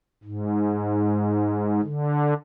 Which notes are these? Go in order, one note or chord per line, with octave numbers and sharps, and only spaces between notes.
G#2
D3